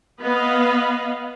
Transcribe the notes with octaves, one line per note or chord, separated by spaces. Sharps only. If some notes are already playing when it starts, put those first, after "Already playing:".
B3 B4 D#5 F5